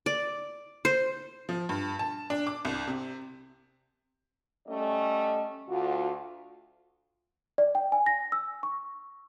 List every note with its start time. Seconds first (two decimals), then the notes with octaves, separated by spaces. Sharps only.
0.06 D5
0.85 C5
1.49 F3
1.69 G2
1.99 A5
2.30 D4
2.47 D6
2.65 C2
2.87 C3
4.67 G3 A3 C#4 D#5
5.68 D2 F4 F#4
7.58 D5
7.75 G5
7.92 G#5
8.06 A#6
8.32 E6
8.63 C#6